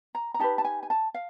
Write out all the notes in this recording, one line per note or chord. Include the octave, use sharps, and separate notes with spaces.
A#5
A#5
D#4 G4 B4 A5
A5
G#5
G#5
A5
F5